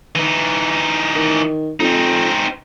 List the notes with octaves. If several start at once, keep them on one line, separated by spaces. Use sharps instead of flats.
E3 D#4
D#3
F2 C4 D#4